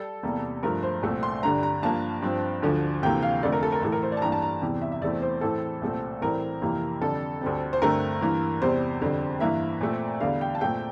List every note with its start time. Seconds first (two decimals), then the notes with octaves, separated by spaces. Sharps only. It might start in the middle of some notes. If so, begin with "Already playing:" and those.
Already playing: G3 A4
0.23 E2 C3 G3 A#3
0.63 G2 F3 A3 A#4
0.83 C5
1.03 C2 A#2 A3 C4
1.23 C6
1.43 G2 D3 G3 A#5
1.63 A#5
1.82 G2 F3 A#3 A5
2.22 G2 F3 C4
2.62 D2 D3 F3
3.03 D2 C3 E3 A#3 G5
3.22 F5
3.43 F2 D3 A3 D5
3.52 A#4
3.63 A4
3.72 A#4
3.82 A2 E3 A3 A4
3.92 A#4
4.03 C5
4.12 D5
4.17 A5
4.22 G2 E3 G3 A#3 A#5
4.32 A5
4.42 A#5
4.62 E2 C3 E3 G3
4.82 E5
4.92 E5
5.01 E2 E3 A3 C4 D5
5.22 C5
5.41 A2 E3 A3 C4 A4
5.82 C2 A#2 A3 C4
6.21 A2 E3 G3 C4 A#4
6.62 F2 C3 E3 A#3
7.01 F2 D3 G3 A4
7.41 D2 D3 G3 C4
7.73 C5
7.82 G2 D3 A3 C4 A#4
8.21 G2 E3 A#3
8.61 E2 C3 G3 C4 C5
9.01 F2 D3 G3 C4
9.40 G2 E3 A#3 E5
9.81 A#2 A3 C4
10.20 E2 D3 G3 F5
10.41 G5
10.55 A5
10.60 A#2 A3 C4 G5